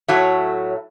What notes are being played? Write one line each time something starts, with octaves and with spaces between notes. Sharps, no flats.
A2 F#3 A3 C#5 E5